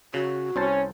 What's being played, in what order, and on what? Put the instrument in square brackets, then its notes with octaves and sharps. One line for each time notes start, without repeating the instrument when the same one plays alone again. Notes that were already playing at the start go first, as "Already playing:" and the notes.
[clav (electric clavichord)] C#3 [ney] F#4
[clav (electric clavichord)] C2 C5 A5 [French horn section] C#4